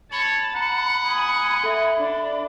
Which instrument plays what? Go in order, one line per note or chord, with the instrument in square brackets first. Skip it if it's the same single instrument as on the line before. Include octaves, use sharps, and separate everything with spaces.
[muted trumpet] C#5 [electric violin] A5 [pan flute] B5
[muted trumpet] F#5 [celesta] A#5
[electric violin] G#5 D#6
[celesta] A4 E5
[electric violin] D4 D5